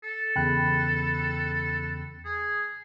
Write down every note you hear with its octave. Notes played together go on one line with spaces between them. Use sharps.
A4
E2 C#3 G5 B5 F#6
G#4